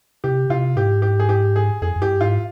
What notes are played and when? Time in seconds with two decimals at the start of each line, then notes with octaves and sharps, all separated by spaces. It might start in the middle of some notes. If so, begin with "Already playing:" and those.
0.24 C3 G4
0.50 C3 F4
0.76 G#2 G4
1.02 G4
1.19 G#4
1.29 G4
1.56 G#4
1.82 F2 G#4
1.96 F2
2.01 G2 G4
2.21 G#2 F4